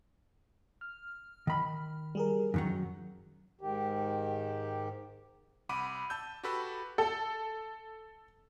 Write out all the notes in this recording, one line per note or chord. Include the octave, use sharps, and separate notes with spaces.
F6
D#3 B5
G3 G#4 A#4
F#2 D#3 F#3
G#2 D#3 G4
C2 F#5 B5 D6 D#7
A5 E6 G6
F#4 G4 A4 B4 B5 E6
A4